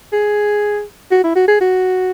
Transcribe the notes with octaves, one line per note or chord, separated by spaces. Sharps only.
G#4
F#4
E4
F#4
G#4
F#4